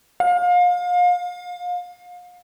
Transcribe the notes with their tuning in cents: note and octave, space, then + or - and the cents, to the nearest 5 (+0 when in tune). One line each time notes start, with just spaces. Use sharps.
F5 +35